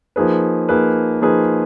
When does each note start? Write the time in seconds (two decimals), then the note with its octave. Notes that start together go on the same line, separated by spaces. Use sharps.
0.16 F3 A#3 D#4 G#4 B4
0.69 F3 A#3 D#4 G#4 B4
1.21 F3 A#3 D#4 G#4 B4